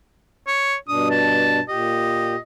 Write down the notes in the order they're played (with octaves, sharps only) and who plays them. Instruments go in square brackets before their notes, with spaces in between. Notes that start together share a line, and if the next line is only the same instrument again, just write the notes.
[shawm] C#5
[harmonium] G2 B2 D4 [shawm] D#6
[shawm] A5
[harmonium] A#2 G4 [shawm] D#5